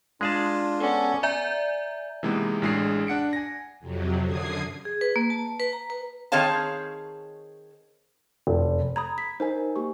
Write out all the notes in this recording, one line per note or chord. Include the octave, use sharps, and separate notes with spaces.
G#3 D4 F4 G#4 A5
B3 C#4 A4 D5
D5 E5 G#5 A#5 G6
C3 E3 G#3 A#3 B3 D#4
A1 A2 G#3 D4 G#4 C7
D4 F#5 C#7 D7
G#5 A#6
F2 C3 F#3
F#2 D3 D#6 G#6 C7
G#4
B4
A#3
A5
B4
A#5
B4
D#3 C4 G#4 C#5 F5 A5
F1
A#5 B5 D#6 G#6
B6
D#4 A#4 C5 G#5
A#3 G4 C#6